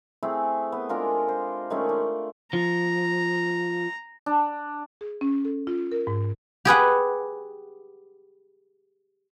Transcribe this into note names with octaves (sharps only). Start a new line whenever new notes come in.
A3 C4 E4 G#4
B3
G#3 D4 F4 A#4
C5
D#3 G#3 A3 C#4
D4
F3 A#5
D4
G#4
C#4
A4
F4
A#4
G#2
G4 G#4 B4 F#5